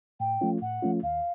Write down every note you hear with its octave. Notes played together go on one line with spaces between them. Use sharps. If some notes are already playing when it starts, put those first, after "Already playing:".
A2 G5
F3 A3 C#4 F4
A2 F#5
F3 A3 C#4 F4
D#2 F5